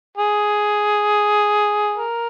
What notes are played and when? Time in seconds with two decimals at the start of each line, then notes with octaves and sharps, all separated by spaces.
0.18 G#4
1.96 A#4